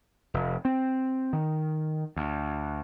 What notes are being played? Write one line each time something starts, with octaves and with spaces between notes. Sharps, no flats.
F1
C4
D#3
D2